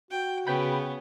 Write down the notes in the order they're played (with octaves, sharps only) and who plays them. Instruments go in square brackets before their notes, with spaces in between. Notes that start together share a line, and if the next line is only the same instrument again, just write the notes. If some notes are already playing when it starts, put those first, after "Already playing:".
[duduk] F#4 [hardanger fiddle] G5
[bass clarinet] C#3 [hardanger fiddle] B3 C#4 [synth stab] B4 G5 B5